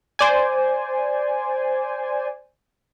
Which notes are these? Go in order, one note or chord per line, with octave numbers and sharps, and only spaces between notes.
C5 D5 G#5